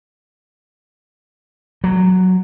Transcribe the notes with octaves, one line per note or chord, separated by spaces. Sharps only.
F#3